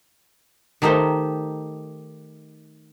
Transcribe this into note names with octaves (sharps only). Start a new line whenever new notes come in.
D#3 A3 D#4 G4 C5